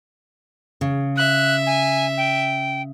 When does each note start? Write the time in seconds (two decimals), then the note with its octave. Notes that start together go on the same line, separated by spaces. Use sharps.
0.81 C#3
1.17 E5 F#6
1.67 G#5
2.17 G5